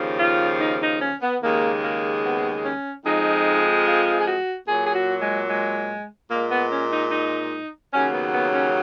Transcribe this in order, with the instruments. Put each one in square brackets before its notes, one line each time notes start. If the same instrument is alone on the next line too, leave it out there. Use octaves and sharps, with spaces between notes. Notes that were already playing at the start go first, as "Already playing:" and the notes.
Already playing: [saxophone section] D#2 C#3 F3
F4
D#4
D#4
C#4
B3
D#2 C#3 G#3 A#3
A#3
B3
C#4
F2 F3 G#3 D#4
F4
G#4
F#4
A#2 F#3 G#4
G#4
F#4
G#3
G#3
A#2 G#3 A#3
B3
C#4
D#4
D#4
D#2 C#3 F#3 C#4
B3
B3
C#4